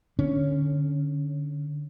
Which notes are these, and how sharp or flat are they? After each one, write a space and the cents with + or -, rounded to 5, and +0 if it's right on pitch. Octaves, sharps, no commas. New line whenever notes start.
D3 +10 C#4 +0